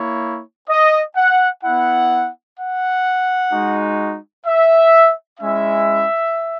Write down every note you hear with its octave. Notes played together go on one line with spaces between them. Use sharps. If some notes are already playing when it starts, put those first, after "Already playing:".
Already playing: A#3 E4 C#5
D#5
F#5
B3 E4 F#5
F#5
G#3 D#4 F#4
E5
G#3 C#4 E4 E5